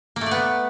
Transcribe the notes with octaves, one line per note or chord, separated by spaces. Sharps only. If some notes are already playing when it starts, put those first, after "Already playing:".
A#3
A3
D5
B3